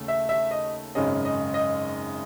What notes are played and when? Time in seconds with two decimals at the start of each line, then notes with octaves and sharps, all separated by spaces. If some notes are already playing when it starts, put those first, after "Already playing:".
Already playing: D#2 C#3 A3
0.08 E5
0.29 E5
0.51 D#5
0.95 G#1 F#2 C#3 G#3 D#5
1.25 D#5
1.54 D#5